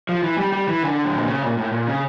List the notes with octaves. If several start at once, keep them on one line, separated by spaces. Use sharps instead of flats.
F3
E3
G3
G3
E3
D3
A2
A#2
C#3
A#2
A2
A#2
C#3